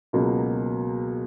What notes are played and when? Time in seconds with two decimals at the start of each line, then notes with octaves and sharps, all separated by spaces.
0.13 C#2 B2 F#3 A#3